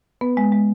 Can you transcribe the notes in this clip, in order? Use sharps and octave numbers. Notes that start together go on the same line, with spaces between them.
B3 B4
G#3
G#3